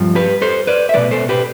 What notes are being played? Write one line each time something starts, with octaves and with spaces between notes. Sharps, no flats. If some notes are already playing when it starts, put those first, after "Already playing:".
Already playing: G2 F3
G4 B4
A4 C5
B4 D5
E5
B2 G3 B4 D5
A4 C5
G4 B4